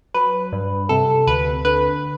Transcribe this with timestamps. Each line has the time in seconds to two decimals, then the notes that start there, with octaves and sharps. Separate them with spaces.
0.14 F#3 B4
0.52 G2
0.89 C3 A4
1.27 D2 B4
1.65 D3 B4